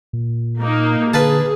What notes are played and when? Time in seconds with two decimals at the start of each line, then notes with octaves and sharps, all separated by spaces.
0.13 A#2
0.61 A#3 D#4
1.14 D3 G#4 B4 F5 A5